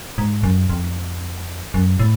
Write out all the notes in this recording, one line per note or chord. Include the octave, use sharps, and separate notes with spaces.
G#2
F#2
F2
F#2
A2